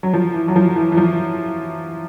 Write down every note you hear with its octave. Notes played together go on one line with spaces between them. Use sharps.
F#3
F3
E3
F#3
F3
E3
E3
F3